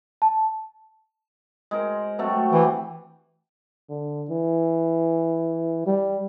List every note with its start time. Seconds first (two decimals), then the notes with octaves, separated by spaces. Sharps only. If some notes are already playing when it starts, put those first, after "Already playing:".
0.22 A5
1.71 G#3 A#4 C5
2.19 C3 F#3 A3
2.52 E3 G4
3.89 D3
4.30 E3
5.87 G3